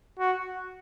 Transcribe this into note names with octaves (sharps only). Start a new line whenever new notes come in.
F#4